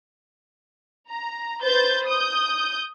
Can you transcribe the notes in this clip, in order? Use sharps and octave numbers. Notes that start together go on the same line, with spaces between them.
A#5
B4 C5 G6 A6
D#6 G6